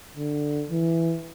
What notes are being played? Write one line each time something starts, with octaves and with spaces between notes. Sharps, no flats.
D3
E3